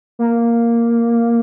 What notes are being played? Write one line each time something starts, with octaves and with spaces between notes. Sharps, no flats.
A#3